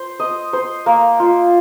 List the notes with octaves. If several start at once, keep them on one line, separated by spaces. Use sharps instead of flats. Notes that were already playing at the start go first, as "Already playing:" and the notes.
Already playing: C5
D#5
C5
A#3
F4